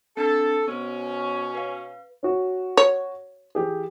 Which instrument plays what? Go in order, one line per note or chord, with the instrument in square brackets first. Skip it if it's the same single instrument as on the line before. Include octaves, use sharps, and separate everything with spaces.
[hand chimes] C4 D4 A6 [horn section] A4
[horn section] B2 C#4 [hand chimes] B3 C5
[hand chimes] B4 F5
[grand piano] C#4 F#4
[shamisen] C#5
[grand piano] E3 G4 G#4